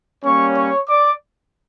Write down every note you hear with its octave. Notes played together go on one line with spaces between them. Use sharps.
G3 A#3 C#4 C#5 C#6
C#5 C#6
D5 D6